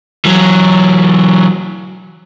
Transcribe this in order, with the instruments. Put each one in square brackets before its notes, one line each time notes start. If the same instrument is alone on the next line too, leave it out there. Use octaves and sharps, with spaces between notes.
[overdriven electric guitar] E3 F#3